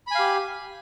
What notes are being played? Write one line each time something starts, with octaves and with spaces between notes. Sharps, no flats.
G4 F5 G#5 B5